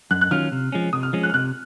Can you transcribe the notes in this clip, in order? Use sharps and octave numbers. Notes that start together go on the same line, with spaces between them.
F#2 F#6
F#6
D#3 F#3 C#4 F4 F6
C3
F3 G#3 C#4
C3 D#6
F6
F3 G#3 C#4
F#6
F6
C3 F#6